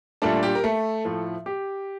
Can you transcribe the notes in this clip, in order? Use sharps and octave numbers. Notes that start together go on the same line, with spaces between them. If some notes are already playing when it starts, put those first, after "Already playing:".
A#2 G3 A3 D4 A4
G4
A#4
A3 A4
A2 F3 A3
G4